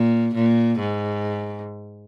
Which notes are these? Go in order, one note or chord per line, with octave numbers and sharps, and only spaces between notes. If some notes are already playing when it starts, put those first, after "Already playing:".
Already playing: A#2
A#2
G#2